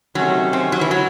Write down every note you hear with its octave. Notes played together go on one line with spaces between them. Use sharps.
C3 D#3 F#3 A3 C#4
C4
F#3
E3
F#3